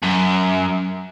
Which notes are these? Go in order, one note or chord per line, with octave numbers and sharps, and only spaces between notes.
F#2